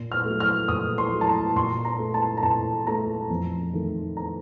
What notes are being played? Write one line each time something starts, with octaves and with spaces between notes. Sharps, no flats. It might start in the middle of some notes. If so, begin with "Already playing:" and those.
Already playing: A#2
F6
F#3 A3
F6
A#2 D#6
C6
F#3 A3
A5
A#5
A#2 C6
A#5
A3
A5
A#5
A#2 A5
A3 A#5
F2
D#3 A3
A#5